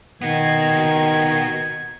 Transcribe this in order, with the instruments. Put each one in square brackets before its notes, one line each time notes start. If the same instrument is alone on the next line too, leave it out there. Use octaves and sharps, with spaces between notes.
[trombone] D#3 [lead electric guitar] B3 F#4 [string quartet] G#6